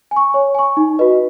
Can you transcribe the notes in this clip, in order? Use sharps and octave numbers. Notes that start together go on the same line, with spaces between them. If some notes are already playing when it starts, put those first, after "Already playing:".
G#5
C#6
C#5
G#5 C#6
D#4
F#4 B4 D#5